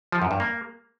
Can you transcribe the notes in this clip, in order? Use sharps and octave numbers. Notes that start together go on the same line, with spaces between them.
F3
F#2
G2
A#3